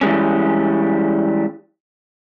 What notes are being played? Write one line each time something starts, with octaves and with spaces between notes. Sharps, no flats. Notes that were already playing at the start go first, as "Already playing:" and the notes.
E3 G3 G#3 C#4